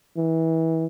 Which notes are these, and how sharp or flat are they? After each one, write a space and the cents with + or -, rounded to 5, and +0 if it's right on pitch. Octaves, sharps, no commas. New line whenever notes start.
E3 -25